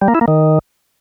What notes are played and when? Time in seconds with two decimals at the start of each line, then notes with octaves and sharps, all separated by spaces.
0.01 G3
0.08 A#3
0.15 E4
0.21 A#3
0.28 D#3